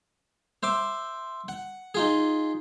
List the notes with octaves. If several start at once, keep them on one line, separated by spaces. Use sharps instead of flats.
C5 E5 D6
F#5
D#4 F4 G#4